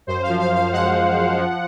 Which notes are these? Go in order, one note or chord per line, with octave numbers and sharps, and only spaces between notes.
F#2 C5
F5
F3
F5
F#2 F5
G#3 F#5
G#3
F#2
F3